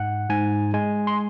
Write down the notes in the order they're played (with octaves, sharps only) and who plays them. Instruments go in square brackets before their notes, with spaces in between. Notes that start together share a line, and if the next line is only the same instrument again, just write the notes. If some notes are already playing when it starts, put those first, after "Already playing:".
Already playing: [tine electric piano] G#2 F#5
G#2 G#5
G#3 G#5
C6